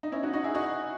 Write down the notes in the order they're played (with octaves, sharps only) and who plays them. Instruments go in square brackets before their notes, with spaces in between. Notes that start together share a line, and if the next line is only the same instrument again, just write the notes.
[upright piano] D#4
C#4 E4
D#4 F#4
D#4 F#4
E4 G#4
D#4 F#4